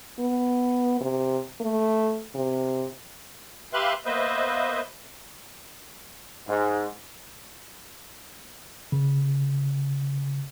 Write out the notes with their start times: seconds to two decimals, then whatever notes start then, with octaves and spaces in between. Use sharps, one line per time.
0.19 B3
1.01 C3
1.61 A3
2.35 C3
3.73 G4 B4 E5 F5 C6 F#6
4.05 A#3 B3 B4 C5 D#5 E5
6.48 G#2
8.92 C#3